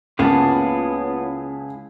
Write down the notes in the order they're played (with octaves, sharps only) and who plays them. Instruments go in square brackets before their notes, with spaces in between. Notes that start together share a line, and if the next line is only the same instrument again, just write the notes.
[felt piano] C#2 [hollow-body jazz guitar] A#3 B3 F4 [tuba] C#4 [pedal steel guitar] E4 G#4 A5